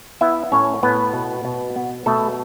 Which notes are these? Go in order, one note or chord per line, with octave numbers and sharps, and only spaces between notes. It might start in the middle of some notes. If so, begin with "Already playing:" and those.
B3 E4 E5
A2 C#4 C#5
A2 B3 B4
B2
B2
B3
B2 A3 A4